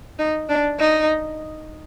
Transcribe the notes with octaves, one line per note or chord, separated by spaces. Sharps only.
D#4
D4
D#4